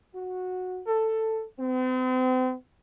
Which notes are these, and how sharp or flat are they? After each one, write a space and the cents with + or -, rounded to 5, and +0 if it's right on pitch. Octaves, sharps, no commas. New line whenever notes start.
F#4 -10
A4 +10
C4 -40